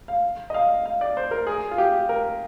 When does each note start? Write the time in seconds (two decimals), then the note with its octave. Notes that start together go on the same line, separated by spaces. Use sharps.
0.08 F5
0.50 D#5
0.54 F5
0.86 F5
1.01 D5
1.17 C5
1.31 A#4
1.47 G#4
1.71 F4
1.78 G4
2.09 A#4